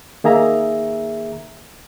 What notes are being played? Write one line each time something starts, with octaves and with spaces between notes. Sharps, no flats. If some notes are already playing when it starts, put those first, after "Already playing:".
D#3 A#3 G#4 E5 A#5